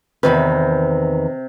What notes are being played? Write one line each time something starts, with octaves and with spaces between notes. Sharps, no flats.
E2 C3 D#3 B4